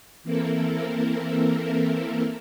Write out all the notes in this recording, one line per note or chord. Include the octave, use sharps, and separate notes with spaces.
E3 A#3 C4 E4 A4 A#4